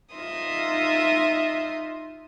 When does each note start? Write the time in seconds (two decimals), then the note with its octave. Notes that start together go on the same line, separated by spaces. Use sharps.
0.16 D#4 F4 D#5 E5 C6 D#6